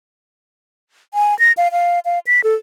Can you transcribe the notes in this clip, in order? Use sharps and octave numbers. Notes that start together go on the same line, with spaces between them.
G#5
A#6
F5
F5
F5
B6
A4